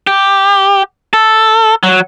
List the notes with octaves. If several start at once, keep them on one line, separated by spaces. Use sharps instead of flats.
G4
A4
F#3